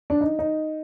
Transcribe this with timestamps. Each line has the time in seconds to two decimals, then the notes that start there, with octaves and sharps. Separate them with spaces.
0.10 D4
0.21 D#4
0.39 D#4